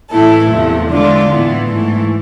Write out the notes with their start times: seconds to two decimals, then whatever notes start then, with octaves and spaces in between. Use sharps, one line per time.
0.11 A2 E3 A3 E4 A4
0.50 E2 C3 F3 A3
0.89 D3 G#3 D4 F4
1.29 A2 E3 B3
1.68 G#2 E3 A3